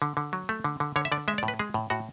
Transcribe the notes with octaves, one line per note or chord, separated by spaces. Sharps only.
D3
D3
F#3
A3
D3
D3
D3 C#5
E5
D3 D5
G#3 E5
D5
A2
B4
G#3 G#4
A2
A2 F#4